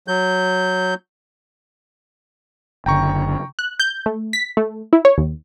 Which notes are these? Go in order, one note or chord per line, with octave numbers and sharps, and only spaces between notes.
F#3 G6
F#1 D3 G5 A#5 C#6
F#6
G6
A3
B6
A3
E4
C#5
D#2